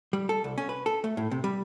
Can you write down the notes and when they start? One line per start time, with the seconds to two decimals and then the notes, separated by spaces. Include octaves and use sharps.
0.13 G3
0.29 A4
0.44 C2
0.58 C#4
0.69 B4
0.86 A4
1.04 A3
1.17 A2
1.31 C3
1.44 G3